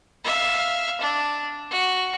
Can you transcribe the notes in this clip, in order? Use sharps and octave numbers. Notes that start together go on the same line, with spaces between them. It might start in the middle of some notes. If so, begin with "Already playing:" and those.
E5 F5
D4
F#4